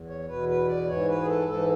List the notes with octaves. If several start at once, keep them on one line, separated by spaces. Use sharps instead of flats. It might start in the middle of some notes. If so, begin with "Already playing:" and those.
Already playing: E2
C#5
E2 B2 B4
B4
D5
G#2 E3 C#5
B4
G#4
A4
G#2 E3 A4